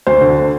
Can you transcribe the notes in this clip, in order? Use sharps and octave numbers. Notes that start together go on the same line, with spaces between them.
D2 C5
D3